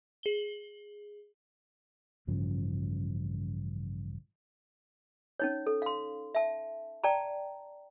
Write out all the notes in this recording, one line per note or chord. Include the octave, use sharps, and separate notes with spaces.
G#4 G7
A1 G2 C#3 F3
C#4 D#4 C#5
A4
F5 C6
E5 A5
D5 G5 A5 A#5